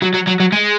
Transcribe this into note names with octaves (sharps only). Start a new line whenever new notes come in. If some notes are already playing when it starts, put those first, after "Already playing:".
F#3
F#3
F#3
F#3
G#3